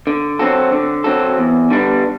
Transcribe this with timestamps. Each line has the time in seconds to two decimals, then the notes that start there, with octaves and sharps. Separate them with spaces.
0.07 D3
0.39 F#3 C4 F#4 A4
0.72 D3
1.04 F#3 C4 F#4 A4
1.38 E2
1.70 D3 G3 B3 D4